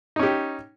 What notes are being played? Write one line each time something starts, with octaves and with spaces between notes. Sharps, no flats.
C#4 D#4 G4